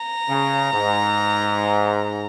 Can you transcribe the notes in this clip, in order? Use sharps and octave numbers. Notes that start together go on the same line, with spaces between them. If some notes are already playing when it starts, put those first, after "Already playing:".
Already playing: A#5
C#3
G#2